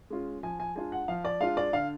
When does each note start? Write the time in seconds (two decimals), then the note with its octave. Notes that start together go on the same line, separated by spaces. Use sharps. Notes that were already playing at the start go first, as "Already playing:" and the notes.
0.10 G#3 C#4 F4
0.43 F3 G#5
0.60 G#5
0.75 G#3 D4 F4 G#5
0.92 F#5
1.08 F3 F5
1.25 D5
1.41 G#3 D4 F4 F5
1.57 D5
1.73 D3 F5